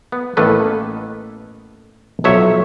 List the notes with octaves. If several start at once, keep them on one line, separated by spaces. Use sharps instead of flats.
B3
A1 D#3 A#3 B3 A4 B4
B1 F3 F#3 C#5 E5